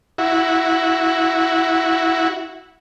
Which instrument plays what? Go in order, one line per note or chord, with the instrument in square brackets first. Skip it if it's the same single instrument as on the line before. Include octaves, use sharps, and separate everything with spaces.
[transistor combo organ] E4 F#4